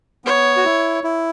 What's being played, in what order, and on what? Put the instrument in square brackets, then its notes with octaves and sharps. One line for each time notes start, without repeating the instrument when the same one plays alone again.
[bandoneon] B3 [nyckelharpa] C#5
[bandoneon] F#4
E4
E4